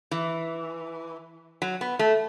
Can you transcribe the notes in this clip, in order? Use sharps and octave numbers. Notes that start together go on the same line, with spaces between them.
E3
F#3
B3
A3